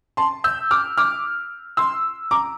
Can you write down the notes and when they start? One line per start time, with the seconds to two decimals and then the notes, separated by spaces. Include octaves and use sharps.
0.17 A5 C6
0.44 E6 G6
0.71 D6 F6
0.98 D6 F6
1.77 C6 E6
2.31 A#5 D6